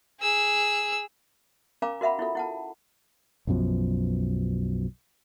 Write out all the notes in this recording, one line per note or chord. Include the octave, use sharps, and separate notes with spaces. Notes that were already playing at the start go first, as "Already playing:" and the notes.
G#4 E6
C#4 A#4 F5 G#5 A#5 D6
F#4 A#4 E5 F#5 B5
E4 F4 A4
E4 F#5 A5
B1 F#2 B2 F3